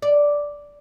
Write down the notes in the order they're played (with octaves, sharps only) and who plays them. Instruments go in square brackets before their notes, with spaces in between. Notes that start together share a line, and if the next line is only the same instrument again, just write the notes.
[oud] D5